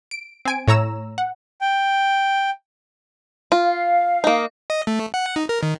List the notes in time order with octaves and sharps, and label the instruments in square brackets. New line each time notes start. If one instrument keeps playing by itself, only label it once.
[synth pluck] D7
C4 G#5 D7
A2 C#5 A#5 E6 E7
F#5
[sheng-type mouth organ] G5
[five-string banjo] F4
[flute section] F5
[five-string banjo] A#3 D#4
[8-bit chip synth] D#5
A3
F#5
D#4
A#4
D#3